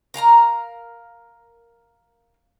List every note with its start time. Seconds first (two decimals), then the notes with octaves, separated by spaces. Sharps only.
0.14 A#4 F5 A5 A#5